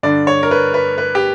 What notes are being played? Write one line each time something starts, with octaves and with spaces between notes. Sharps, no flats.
G2 D3 D5
C#5
A#4
B4
B4
B4
G4